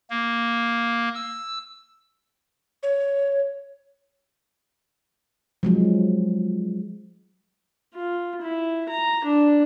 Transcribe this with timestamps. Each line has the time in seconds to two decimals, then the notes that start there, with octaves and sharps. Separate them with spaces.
0.10 A#3
1.14 E6
2.83 C#5
5.63 F3 F#3 G#3
7.94 F4
8.41 E4
8.89 A#5
9.24 D4